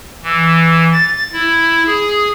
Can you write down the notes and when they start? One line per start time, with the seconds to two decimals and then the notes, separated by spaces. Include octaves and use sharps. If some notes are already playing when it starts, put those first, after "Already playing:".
0.24 E3
0.93 A6
1.32 E4
1.86 G#4